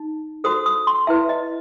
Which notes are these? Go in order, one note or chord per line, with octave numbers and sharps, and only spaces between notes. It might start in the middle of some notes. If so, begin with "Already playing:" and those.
Already playing: D#4
F#4 A4 C5 D#6
D#6
C6
E4 B4 E5
D#5